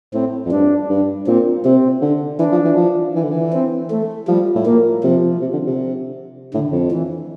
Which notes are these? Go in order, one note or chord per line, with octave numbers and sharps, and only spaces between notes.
A2 C4
F2
G2 D4
G2
A#2 C4
C3 C4
D3
E3 D4
F3
E3
F3
E3
D3
E3
C4
A3
F3 G3
A2
A#2 A#3
C3 F3
C3
D3
C3
A2 D3
F2
E3